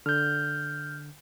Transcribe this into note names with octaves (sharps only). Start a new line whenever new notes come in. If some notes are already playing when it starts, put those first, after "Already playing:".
D3 F6 G6